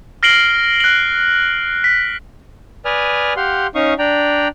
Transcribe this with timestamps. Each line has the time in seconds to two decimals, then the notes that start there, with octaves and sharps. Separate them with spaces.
0.23 F6 A#6 C7 D7 F#7 G7
0.80 F#6 F#7
1.84 B6
2.85 B4 D5 G#5 D#6 F6
3.36 G4 F5 F#5 C6
3.75 C#4 D#4 F5 C#6 D#6
3.99 D4 D5 G5 A#5